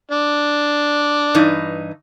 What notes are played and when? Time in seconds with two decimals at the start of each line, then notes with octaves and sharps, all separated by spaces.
0.11 D4
1.35 G2 E3 D#4